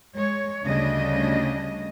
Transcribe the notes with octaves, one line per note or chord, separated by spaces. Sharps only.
G#3 C#5
D2 C#3 G3 A3 D4 D#5